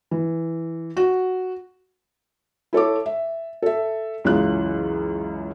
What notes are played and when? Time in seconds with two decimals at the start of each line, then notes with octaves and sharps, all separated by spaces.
0.11 E3
0.97 F#4
2.73 E4 A4 C#5 D6
3.06 E5
3.62 A4 E5
4.24 C#2 F#2 E3 F4 F#6